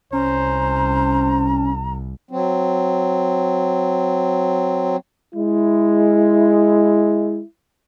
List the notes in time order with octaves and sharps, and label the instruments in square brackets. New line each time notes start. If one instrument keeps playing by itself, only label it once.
[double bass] C2 [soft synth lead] C#4 [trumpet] C5 [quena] A#5
[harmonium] F#3 C4
[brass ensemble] G#3 E4